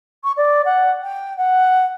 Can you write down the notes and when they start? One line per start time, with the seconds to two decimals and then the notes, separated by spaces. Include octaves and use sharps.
0.23 C#6
0.36 D5
0.65 F#5
1.02 G5
1.37 F#5